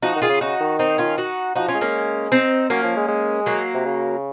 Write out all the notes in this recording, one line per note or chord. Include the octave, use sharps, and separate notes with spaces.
F3 D#4 F#4
D#3
F4 G#4
C#3
C#3 D#4 F#4
D#3
C4 D#4
C#4 F4
D#4 F#4
F3 D#4 F#4
C#4 F4
G#3
A#3 C#4
C4 D#4
F#3 A#3 C#4
F3
G#3
G#3
F#3 A#3
C3
C#3